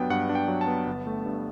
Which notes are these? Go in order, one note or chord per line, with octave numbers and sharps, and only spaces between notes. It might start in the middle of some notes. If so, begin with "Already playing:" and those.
Already playing: G2 F#3 B3 D4 G5
G2 F#5
D4
G5
F#3
A5
B3
G1
A3
G2